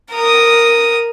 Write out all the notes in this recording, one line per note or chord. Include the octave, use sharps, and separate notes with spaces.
A#4 D#6